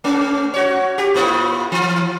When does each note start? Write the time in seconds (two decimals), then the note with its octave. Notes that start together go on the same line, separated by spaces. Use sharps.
0.04 A3 C#4
0.54 F#4 C#5
0.98 G4
1.14 A2 A#3 F4
1.72 E3